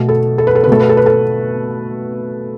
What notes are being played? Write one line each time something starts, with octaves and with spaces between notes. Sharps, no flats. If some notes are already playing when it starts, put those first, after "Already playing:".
Already playing: B2 A3
A4
A4
B4
A4
B4
B2 A3 A4
B4
A4
B4
A4